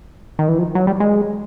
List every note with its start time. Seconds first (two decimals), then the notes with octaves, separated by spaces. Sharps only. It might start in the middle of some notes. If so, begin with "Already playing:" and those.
0.39 D#3
0.49 E3
0.58 F3
0.75 F#3
0.87 G3
1.00 G#3